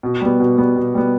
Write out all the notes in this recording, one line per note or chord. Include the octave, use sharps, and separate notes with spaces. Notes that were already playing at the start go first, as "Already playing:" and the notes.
B2
G3 B3
B2
G3 B3
B2
G3 B3